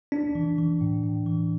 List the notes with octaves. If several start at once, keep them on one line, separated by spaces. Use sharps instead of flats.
D4
E3
E3
A2
A2
E3